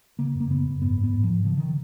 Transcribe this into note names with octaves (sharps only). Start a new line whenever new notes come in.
C#3 A#3
F#2
A#3
C#3 B3
F#2
G#2 B3
G#2
B3
G#2
F3
G#2
C#3 F3
D#3